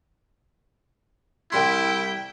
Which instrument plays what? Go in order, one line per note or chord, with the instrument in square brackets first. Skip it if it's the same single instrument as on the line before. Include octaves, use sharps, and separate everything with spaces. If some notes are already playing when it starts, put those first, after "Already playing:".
[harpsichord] C2 G3 C6 [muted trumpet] E4 [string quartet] G5